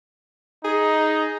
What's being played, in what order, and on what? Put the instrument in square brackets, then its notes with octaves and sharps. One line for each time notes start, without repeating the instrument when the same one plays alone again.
[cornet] D#4 [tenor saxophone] G#4